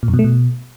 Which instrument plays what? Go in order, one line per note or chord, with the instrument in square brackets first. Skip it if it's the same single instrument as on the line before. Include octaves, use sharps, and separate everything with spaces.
[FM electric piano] A#2
F#2
B2
A3
B2